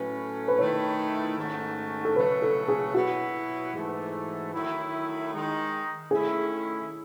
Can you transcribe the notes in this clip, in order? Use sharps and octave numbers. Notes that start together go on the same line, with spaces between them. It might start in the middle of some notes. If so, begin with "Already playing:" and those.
Already playing: A2 F#3 A3 C#4 B4
B4
D#3 A3 E4 C#5
G#2 D#3 A3 C#4 F#4
A4
C#3 F#3 A3 B4
A4
G#4
B2 F#3 B3 E4 F#4
G#2 E3 A3
D#3 F#3 A3 E4
D#3 G#3 D#4
D#3 A3 C#4 E4 G#4